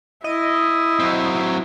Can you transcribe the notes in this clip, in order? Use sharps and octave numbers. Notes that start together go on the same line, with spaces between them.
E4 D#5
F#3 C4